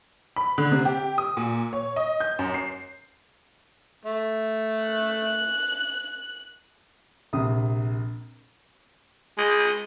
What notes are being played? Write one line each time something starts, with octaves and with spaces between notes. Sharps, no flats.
B5
D3
C3
G4
D#6
A#2
C#5
D#5
G6
F#2
C7
A3
F#6
A#1 C3 D#6
G#3